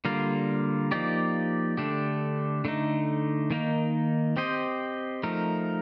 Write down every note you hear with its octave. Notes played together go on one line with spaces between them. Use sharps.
D3 G3 A#3 F4 A#4
F3 A#3 D#4 G4 D5
D3 A3 D4 G4
D3 A3 D#4
D#3 A#3 D#4
C4 G4 C5 D#5
F3 A3 D#4 A#4